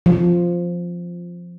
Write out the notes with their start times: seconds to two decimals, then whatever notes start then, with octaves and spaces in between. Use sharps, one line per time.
0.06 F3